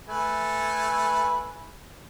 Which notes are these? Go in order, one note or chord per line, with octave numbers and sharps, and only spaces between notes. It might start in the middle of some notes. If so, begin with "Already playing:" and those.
A3 B4 G#5